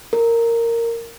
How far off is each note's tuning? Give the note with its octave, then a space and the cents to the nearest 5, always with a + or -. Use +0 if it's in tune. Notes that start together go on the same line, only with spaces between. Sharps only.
A#4 -10